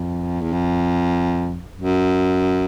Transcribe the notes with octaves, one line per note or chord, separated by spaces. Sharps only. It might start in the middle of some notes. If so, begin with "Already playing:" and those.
Already playing: F2
E2
F2
F#2